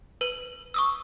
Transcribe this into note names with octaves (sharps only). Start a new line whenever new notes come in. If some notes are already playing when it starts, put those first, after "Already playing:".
B4 D#7 F#7
C#6 D#6 E6